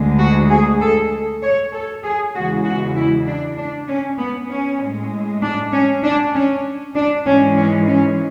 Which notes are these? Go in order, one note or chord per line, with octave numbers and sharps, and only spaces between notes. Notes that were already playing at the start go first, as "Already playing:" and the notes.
Already playing: D2 D3 G#3
F#4
G#4
A4
C#5
A4
G#4
E2 C#3 E3 G#3 F#4
F#4
E4
D4
D4
C#4
B3
C#4
A2 G#3
D4
C#4
D4
C#4
D4
G#2 E3 G#3 C#4
C#4
C#4